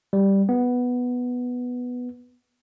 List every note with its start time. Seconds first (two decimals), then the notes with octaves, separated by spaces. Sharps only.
0.13 G3
0.49 B3